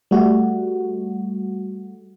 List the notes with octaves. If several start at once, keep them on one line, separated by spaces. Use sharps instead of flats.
G3 A3 F#4